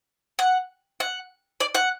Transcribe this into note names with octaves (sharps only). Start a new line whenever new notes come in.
F#5
F#5
D5
F#5